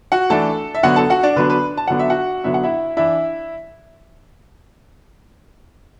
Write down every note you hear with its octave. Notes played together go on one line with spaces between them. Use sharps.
F#4 F#5
E3 A3 D4 A4 A5
E5
D3 F#3 B3 D4 F#4 F#5
A4 A5
F#4 F#5
D4 D5
D3 F#3 B3 D4 B4
B4
A5
D3 F#3 B3 D4 F#5
E5
F#4 F#5
D3 F#3 B3 D4 E5
F#5
E4 E5
E3 D4 E4 E5